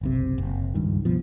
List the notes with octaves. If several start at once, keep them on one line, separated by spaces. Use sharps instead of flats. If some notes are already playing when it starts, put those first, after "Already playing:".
F#1 B1 C3
F#1
C#2 G2 D#3
B2 F3